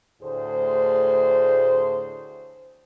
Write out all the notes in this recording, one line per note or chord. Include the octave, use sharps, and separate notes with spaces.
D2 A2 G#4 C5